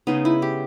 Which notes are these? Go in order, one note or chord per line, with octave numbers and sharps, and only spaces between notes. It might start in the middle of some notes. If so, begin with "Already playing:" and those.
C#3 G#3 B3 D#4
E4
G4